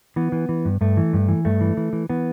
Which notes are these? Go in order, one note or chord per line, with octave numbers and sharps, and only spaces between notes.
E3 B3
E3
E3
G2
G2 A3
E3
G2
E3
G2 A3
E3
E3
E3
E3 B3